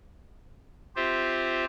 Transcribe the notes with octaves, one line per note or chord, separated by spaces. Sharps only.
C4 F4 G4 C5 E5